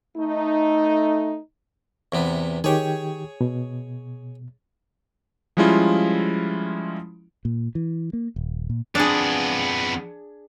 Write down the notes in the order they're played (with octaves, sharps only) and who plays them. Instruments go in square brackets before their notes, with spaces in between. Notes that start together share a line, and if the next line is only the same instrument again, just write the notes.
[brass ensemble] A3 D#4
[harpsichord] E2 C3 B3
[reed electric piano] D#3 G4 G5 [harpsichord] G#4 C#5
[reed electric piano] B2
[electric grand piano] F3 G3 G#3 C#4 E4 F4
[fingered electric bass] A#2
E3
A#3
D#1
A#2
[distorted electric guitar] F2 B3 [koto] D4 G#4